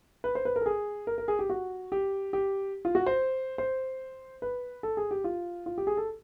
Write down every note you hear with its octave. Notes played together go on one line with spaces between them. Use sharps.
B4
C5
B4
A#4
A4
G#4
A#4
A#4
G#4
G4
F#4
G4
G4
F4
F#4
C5
C5
B4
A4
G#4
G4
F4
F4
G4
G#4
A4